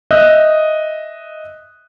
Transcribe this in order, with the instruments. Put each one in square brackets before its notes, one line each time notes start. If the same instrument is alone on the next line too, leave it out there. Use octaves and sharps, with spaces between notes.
[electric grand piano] D#5 E5 D#6 E6 F#6 G6